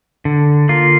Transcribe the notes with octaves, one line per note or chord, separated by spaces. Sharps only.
D3
A#3 F4